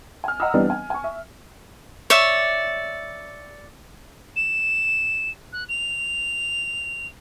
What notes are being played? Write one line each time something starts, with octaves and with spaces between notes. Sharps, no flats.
G#5 F6
D#5 F#5 A#5 B5 D#6 E6
E3 G3 B3 C4 D4 D#4
G#5
G#5 C#6
E5
C#5 D5 E5
E7
F#6
F7